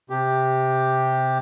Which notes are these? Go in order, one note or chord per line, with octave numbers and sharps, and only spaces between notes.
C3 G4